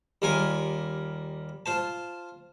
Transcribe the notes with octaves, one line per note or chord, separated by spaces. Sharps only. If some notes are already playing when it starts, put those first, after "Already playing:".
D#2 G3 F4 A#4 G#5
F4 C5 A5